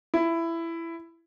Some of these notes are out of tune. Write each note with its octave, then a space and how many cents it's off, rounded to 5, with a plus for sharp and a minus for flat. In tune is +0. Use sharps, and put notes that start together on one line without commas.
E4 +15